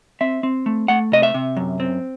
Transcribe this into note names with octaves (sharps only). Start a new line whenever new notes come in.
C4 E5
C4
A3
A3 F#5
C3 D#5
E5
C3
F#2
C4